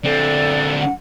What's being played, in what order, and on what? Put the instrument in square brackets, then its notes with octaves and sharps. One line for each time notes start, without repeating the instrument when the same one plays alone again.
[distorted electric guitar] D3 C4 [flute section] A4 D5
[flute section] F#5